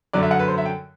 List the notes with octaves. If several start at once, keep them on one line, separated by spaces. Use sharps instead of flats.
F#2 D3 F#3 D5
E5
F#5
B4
C5
E5
G5